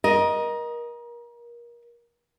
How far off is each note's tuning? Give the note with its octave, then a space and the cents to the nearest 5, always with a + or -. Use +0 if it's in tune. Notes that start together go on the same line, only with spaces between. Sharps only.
A#4 +30 D#5 +0